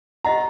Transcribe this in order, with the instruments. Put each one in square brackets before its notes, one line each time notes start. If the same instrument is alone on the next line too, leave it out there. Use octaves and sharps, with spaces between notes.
[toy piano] G4 C5 D#5 F#5 [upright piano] A#5